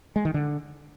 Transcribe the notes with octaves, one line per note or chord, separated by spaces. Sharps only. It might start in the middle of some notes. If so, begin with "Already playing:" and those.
G#3
D#3
D3